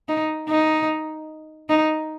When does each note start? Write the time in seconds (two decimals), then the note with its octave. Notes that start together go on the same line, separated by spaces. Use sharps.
0.09 D#4
0.49 D#4
1.69 D#4